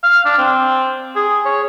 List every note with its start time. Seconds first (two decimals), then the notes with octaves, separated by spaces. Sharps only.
0.03 F5
0.25 D4
0.38 C4
1.16 G#4
1.45 C#5